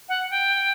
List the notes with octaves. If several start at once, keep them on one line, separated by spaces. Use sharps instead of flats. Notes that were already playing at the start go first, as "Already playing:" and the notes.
F#5
G5